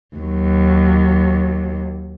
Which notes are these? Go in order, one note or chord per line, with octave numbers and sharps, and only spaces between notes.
D#2 F#3